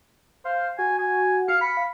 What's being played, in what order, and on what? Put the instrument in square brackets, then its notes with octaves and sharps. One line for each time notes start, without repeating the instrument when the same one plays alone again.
[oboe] C5 [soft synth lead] F5
[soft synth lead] F#4 [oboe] G#5
[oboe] G#5
[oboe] F5 [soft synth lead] C#7
[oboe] B5
[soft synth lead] F5